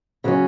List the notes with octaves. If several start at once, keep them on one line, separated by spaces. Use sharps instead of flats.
C#3 F#3 C#4